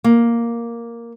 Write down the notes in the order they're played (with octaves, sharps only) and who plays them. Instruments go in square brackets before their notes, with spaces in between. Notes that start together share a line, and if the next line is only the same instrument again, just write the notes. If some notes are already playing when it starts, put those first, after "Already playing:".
[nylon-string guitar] A#3